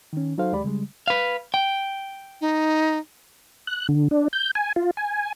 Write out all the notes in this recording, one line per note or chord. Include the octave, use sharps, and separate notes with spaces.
D#3 C#4
F#3 D#4 F#4 A4 C5 F5
D#2 G#3 G4 D5 B5
C#3 G3 G#3
B4 F5
G5
D#4
F#6
D3
D4
G6
G#5
F4
G#5